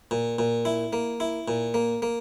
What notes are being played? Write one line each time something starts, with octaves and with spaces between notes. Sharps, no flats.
A#2
A#2
E4
A#3
E4
A#2
A#3
A#3